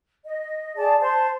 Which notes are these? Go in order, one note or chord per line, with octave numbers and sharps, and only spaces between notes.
D#5
G#4 D5 A5
C5 A5 C6